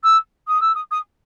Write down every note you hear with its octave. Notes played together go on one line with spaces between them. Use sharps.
E6
D#6
E6
D#6
D#6